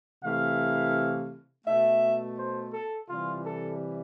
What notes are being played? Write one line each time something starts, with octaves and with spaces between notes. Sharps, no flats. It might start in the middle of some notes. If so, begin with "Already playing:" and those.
C3 E3 A3 F5
B2 A3 E5
C5
A4
C3 E3 G3 F4
A4